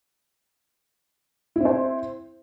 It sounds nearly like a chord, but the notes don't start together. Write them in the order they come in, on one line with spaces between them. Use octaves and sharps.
E4 C4 C5